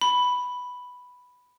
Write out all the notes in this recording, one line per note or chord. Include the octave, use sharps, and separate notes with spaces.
B5